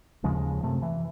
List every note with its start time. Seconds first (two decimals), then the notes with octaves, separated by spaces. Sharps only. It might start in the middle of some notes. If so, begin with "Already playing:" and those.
0.24 D#2 C#3 F3 G#3
0.63 F#2 C3 A3
0.82 E3